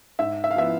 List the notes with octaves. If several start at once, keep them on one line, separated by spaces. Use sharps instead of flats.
G#2 E5
E5
F5
F3 B3 E4 E5